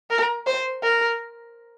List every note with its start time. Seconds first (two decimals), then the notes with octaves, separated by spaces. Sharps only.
0.10 A#4
0.47 C5
0.83 A#4